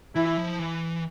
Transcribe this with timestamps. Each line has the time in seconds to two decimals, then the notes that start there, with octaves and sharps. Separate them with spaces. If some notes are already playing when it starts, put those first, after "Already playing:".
0.15 E3 E4
0.37 F3
0.59 E3